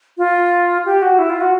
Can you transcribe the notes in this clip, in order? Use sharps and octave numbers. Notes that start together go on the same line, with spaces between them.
F4
G4
F#4
E4
F4
F#4